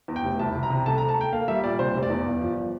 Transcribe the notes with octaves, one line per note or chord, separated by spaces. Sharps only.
E2
G5
F1
C2 A5
C2
A#5
C3
A3 A5
A#5
A3
A5
A3 G5
A#3 F5
G3 E5
A#2 D5
C3 C5
F1
D5
E2
G1
F3